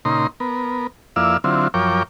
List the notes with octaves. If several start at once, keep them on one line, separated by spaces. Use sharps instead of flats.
A#2 C#3 D#4 A#5 C6
B3 A#4
F2 A#3 E4 D5 F5 E6
D3 F#3 C4 E4 F4
F#2 F3 A#4 C#5 G5 D6